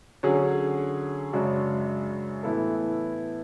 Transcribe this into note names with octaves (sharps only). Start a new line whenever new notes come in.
D3 F#3 C#4 G#4
F#2 C#3 G#3 D4 F#4
A2 E3 B3 E4 A4